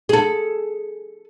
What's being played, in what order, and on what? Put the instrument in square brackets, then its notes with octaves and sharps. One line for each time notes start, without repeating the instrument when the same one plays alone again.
[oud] G#4 A4